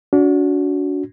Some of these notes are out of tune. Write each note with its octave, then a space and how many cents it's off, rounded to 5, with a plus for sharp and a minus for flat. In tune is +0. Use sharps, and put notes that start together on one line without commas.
D4 -35 F#4 -10